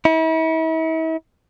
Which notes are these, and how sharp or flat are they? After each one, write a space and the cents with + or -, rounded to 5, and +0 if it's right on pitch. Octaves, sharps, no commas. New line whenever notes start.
E4 -40